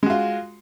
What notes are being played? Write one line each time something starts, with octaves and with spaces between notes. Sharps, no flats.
G#3 F4 F#4